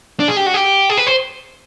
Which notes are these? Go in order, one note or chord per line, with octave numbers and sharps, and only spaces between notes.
D4
G#4
G4
F#4
G4
G#4
B4
C5